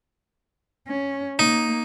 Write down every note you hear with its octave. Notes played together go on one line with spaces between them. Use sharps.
C#4
A#3 D#4